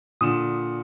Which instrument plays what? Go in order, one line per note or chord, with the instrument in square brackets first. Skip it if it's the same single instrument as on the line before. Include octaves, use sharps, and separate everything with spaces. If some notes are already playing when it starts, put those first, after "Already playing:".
[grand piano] A#2 D3 E7 [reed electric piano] D#6